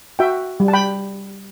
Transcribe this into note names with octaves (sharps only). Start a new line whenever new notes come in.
F#4 E5 G5
G3
A5
G5 B5